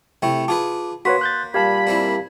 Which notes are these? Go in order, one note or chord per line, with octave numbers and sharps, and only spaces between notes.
C3 A3 E4 G5 C#6
F4 G#4 B4 A5 D6
A#3 F#4 B4 C#5 C6 B6
F#6 G6 A6
A#2 G3 G4 F5 A5 B5 G#6
A#3 C4 E4